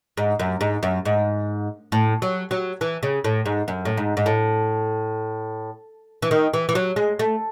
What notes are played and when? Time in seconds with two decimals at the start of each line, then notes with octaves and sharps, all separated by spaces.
0.17 G#2
0.39 F#2
0.61 G#2
0.83 F#2
1.05 G#2
1.92 A2
2.22 F#3
2.51 F#3
2.81 E3
3.03 C#3
3.24 A2
3.46 G#2
3.68 F#2
3.85 A2
3.97 G#2
4.17 G#2
4.26 A2
6.22 E3
6.31 D#3
6.53 E3
6.69 E3
6.75 F#3
6.96 G#3
7.19 A3